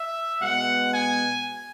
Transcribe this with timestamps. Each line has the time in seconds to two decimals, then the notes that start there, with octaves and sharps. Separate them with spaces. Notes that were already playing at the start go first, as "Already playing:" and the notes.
Already playing: E5
0.41 B2 G#3 B3 F#5
0.94 G#5